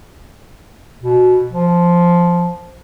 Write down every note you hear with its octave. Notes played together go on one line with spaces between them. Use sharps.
B2
F3